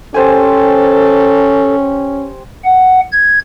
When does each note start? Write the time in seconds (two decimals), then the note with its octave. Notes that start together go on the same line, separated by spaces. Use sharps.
0.14 C#4 G4 A4 C5 G#5
2.65 F#5
3.13 G#6